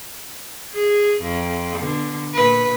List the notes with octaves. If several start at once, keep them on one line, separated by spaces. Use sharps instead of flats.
G#4
F2
B2 D3
A#2 B4